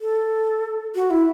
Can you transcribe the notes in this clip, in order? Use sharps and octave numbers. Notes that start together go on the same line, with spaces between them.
A4
F#4
E4